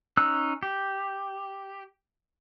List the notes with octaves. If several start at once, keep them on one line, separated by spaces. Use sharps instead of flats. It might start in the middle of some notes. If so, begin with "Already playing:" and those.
C#4 D#4 E6 F#6
G4